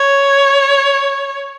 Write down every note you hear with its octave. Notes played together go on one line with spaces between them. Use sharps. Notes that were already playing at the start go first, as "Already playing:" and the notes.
Already playing: C#5